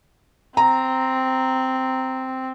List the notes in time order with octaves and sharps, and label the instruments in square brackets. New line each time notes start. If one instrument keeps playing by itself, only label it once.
[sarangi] C4 [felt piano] A#5